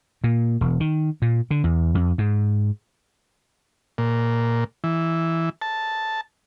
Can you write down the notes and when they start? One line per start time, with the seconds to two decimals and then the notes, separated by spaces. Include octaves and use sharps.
0.24 A#2
0.61 E1
0.80 D#3
1.22 A#2
1.51 D3
1.64 E2
1.95 F2
2.18 G#2
3.98 A#2
4.84 E3
5.62 A5